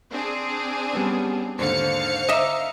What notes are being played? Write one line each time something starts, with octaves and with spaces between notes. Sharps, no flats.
C4 D4 G#4
G3 B3 C#4
D#2 G#2 D3 C5 F5 C#7
D#5 E5 A#5 D6